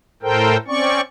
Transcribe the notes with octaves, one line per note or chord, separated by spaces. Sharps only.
A2 A4 A#4 C5 G5
C4 C#4 D5 C#6